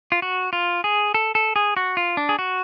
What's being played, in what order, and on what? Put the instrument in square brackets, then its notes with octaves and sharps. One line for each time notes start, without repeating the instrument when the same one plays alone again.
[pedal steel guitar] F4
F#4
F4
G#4
A4
A4
G#4
F#4
F4
D4
G#4
F#4